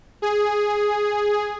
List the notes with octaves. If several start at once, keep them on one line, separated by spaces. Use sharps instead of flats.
G#4